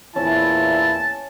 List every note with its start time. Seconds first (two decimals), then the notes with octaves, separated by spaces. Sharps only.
0.16 E2 A#2 C#4 E4 A5